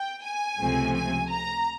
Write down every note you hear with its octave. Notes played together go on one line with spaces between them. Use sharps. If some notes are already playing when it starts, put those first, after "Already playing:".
Already playing: G5
G#5
C#2 C3 F3 A3 C4
G#5
A#5